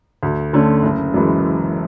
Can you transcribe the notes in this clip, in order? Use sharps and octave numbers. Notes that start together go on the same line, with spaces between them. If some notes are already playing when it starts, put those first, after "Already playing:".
D2
D3 A3 C#4
F#1
F#2 E3 G#3